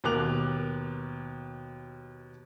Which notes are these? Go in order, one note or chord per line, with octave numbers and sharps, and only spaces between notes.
D#2 B2 A#4 D6 F#6 F7